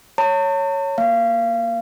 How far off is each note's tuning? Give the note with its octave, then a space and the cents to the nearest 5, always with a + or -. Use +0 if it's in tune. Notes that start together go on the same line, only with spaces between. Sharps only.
C#5 +0 A5 +45
A#3 +10 F5 -30